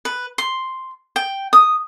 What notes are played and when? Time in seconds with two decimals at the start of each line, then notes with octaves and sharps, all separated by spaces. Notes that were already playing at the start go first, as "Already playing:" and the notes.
0.05 B4
0.38 C6
1.16 G5
1.53 D#6